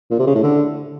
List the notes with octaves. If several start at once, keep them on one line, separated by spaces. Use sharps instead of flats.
A#2
C3
C#3
A2
D3